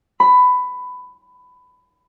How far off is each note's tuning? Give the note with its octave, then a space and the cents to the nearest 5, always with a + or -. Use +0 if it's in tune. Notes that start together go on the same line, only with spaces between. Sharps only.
B5 +15